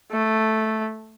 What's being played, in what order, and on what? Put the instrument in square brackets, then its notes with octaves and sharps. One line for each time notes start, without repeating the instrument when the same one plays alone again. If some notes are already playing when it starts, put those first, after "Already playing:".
[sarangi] A3